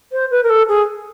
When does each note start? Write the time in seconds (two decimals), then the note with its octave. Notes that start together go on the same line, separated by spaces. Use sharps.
0.12 C5
0.31 B4
0.43 A#4
0.50 A4
0.69 G#4